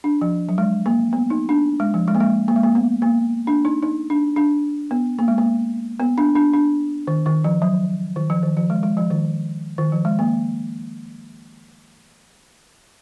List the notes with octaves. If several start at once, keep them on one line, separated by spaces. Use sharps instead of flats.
D4
F3
F#3
G#3
A#3
B3
D#4
D4
G#3
F3
G#3
A#3
G#3
A#3
G#3
A#3
B3
A#3
D4
D#4
D#4
D4
D4
B3
A#3
G#3
A#3
B3
D4
D4
D4
D#3
D#3
F3
F#3
D#3
F3
D#3
F3
G#3
G#3
F3
D#3
D#3
F3
G#3
A#3